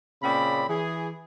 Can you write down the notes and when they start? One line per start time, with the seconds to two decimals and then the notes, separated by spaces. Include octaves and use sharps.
0.22 A#2 C#3 C4 C#4 D5 B5
0.69 E3 G#4